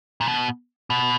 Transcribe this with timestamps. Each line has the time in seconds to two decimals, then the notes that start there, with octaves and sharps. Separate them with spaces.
0.21 A#2
0.28 B2
0.90 B2